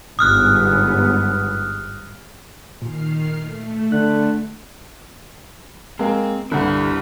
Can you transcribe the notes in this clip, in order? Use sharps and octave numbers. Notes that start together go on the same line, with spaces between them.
G1 G#2 B3 D#6 F6 F#6
A#2 D#3 F6 C7
A3
D3 F#6
G#3 A#3 C4
C2 G2 D3 E4 F#5